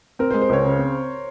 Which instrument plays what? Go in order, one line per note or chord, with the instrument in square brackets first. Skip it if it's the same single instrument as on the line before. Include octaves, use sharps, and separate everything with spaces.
[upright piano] C4 [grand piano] A#4
[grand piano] C5
[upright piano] G#3
[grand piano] C5
[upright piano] C#2 [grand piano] C#5
[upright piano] C#3
C4